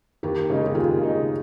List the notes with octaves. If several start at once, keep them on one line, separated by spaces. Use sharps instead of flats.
D#2 G4 A#4
C#3 G#3 D#4
G4
D#2 F4 G#4
C#3 G#3 D#4